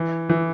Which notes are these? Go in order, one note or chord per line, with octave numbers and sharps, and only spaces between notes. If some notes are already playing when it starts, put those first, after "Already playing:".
Already playing: E3
E3